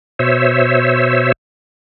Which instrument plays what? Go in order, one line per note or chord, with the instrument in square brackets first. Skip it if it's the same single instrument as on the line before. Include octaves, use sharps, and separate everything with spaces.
[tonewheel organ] B2 C5 C#5 E5 E6